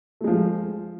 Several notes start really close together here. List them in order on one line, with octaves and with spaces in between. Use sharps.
A3 G#3 F3